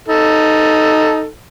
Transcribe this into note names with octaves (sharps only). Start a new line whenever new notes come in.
D#4 A4